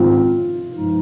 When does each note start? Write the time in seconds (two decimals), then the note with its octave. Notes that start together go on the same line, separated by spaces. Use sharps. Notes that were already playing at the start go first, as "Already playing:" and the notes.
Already playing: G#2 D#3 G#3 C4 F4
0.72 G2 F3 G#3 D#4